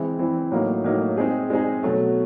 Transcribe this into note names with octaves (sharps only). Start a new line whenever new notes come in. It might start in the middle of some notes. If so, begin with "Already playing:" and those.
Already playing: E3 G#3 C4 E4
E3 G#3 C4 E4
A2 F#3 A#3 D#4
A2 F#3 A#3 D#4
G#3 C4 D#4 G#4
G#3 C4 D#4 G#4
B2 F#3 A3